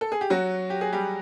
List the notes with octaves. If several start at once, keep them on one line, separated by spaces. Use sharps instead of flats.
A4
G#4
G4
F#3 F#4
G4
G#4
G3 G4